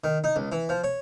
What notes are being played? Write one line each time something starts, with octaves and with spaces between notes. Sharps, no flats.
D#3
D#4
C#2
E3
F3
C#5